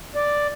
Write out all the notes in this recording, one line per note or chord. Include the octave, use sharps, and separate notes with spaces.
D5